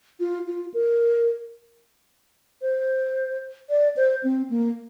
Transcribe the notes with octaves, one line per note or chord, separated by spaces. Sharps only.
F4
F4
A#4
C5
D5
C5
C4
A#3